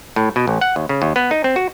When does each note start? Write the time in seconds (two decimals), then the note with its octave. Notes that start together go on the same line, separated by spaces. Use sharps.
0.16 A2
0.36 B2
0.48 A1
0.61 F#5
0.76 D#2
0.89 C#3
1.02 D#2
1.16 B3
1.31 D#4
1.44 C4
1.56 F#4